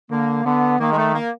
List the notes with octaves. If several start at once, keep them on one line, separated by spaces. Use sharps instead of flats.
D3 A#3
D3 B3
D#3 A#3
G#3
A3
A#3